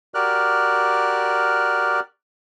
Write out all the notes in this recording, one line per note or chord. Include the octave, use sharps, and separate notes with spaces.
F#4 G4 A#4 D5 F6 F#6